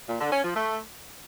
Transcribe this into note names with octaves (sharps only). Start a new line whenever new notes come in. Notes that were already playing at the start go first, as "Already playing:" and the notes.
A#2
D3
C#4
F3
A3